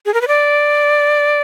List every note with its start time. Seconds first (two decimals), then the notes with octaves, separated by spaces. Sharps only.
0.06 G#4
0.14 A#4
0.21 B4
0.28 D5